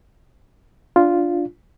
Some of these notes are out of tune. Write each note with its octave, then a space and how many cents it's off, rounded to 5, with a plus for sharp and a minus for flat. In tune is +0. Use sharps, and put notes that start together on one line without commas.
D4 +0 F4 +0